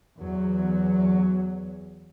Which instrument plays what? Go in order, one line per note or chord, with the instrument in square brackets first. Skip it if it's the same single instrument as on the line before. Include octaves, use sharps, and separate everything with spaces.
[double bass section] E2 F#3